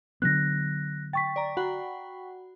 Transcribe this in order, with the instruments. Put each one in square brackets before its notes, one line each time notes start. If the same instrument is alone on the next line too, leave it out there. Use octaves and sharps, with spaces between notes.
[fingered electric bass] D3 F#3 B3 [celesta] F#6 A#6
[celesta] G5 C#6 B6 [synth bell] A6
[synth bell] D5 A#5
F#4 F#5 B5